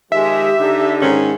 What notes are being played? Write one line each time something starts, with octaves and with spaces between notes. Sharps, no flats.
D#3 F3 G#3 G4 E5
D3 D#4
G#2 D#3 C#4